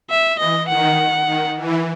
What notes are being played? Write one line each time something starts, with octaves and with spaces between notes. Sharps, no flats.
E5
E3 D#5
D#3 F#5
D#3
E3